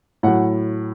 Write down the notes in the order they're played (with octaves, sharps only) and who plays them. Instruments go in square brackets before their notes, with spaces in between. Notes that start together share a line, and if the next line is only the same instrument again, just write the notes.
[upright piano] A2 F#3 F#5